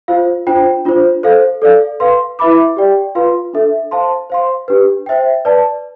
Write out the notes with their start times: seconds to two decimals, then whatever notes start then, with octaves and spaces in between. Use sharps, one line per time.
0.08 F4 C5 F5
0.47 D4 F4 C5 G5
0.85 D4 F4 C5
1.23 A4 C5 F5
1.62 A4 D5 F5
2.00 B4 F5 C6
2.39 E4 B4 E5 B5 D6
2.76 G4 D5 G5
3.15 F4 B4 F5 C6
3.53 D4 A4 E5
3.91 C5 F5 A5 C6
4.30 C5 F5 C6
4.68 D4 G4 B4
5.06 C5 E5 G5
5.45 B4 D5 A5